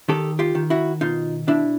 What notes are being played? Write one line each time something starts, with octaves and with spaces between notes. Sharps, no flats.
D#3 G4 A4
F4 G4
D#3
E4 F#4
B2 D#4 F4
B2 D4 E4